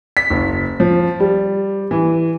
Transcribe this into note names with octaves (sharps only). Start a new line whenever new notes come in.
B6
F#1
F3
G3
E3